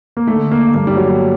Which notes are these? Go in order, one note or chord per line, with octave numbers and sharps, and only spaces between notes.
A#3
D3 A3
A#3
G2 A#3
G3
F#3